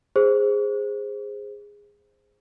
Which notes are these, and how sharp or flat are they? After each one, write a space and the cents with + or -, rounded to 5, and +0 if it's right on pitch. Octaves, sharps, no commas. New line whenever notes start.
G#4 -15 C5 +0